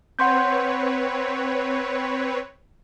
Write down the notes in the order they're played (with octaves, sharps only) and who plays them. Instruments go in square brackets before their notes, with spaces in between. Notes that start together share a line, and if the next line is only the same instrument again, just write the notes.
[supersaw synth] C4 B4 C#5 [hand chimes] F#5 C6 G6